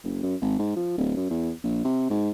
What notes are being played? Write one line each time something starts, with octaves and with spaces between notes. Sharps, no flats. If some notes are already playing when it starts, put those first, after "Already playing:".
F#1
F#2
G#1
G#2
F3
D1
F#2
E2
A#1
C3
G#2